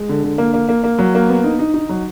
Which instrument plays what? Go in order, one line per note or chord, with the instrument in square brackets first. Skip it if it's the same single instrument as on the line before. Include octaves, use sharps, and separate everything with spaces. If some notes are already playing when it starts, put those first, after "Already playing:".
Already playing: [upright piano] G#3
D3
D3
A#3
A#3
A#3
A#3
F#3
A#3
B3
D#4
D#4
D#4
F#3